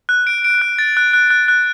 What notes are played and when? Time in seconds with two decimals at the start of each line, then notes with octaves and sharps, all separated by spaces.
0.09 F#6
0.27 D7
0.45 D7
0.62 F#6
0.79 A6
0.97 F#6
1.13 F#6
1.30 F#6
1.48 F#6